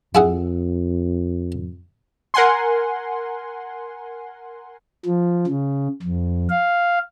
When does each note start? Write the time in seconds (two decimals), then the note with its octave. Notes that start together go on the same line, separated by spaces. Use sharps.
0.15 F2 E4 G#4 F#5
2.34 A#4 F#5 G#5 C6
5.05 F3
5.47 C#3
6.02 F2
6.50 F5